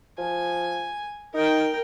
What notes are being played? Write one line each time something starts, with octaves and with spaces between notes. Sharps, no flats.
F3 G#5
D#4 A#4 G5